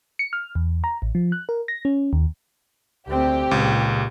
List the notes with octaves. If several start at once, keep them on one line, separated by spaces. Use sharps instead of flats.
C#7
F6
E2
A#5
A1
F3
F#6
A#4
A#6
C#4
D#2
D2 C4 G4
C#2 A#2